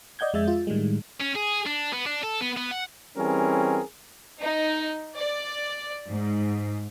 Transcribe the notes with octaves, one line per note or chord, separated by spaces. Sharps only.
D5 D#5 F#5 G6 G#6
F2 G#3 G#4 E5 A6
F4
A2 D#3 G3 G#3
C#4
G#4
D4
B3
D4
A4
B3
B3
F#5
E3 G3 C4 C#4 G#4 A#4
D#4
D5
G#2